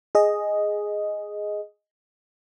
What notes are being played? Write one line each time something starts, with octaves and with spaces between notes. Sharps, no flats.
G#4 D#5